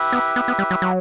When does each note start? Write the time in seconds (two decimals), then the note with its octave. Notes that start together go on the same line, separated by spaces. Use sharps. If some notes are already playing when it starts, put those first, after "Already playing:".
Already playing: E4 G4 B4 E5
0.13 B3
0.36 B3
0.48 B3
0.59 G3
0.71 F#3
0.82 F#3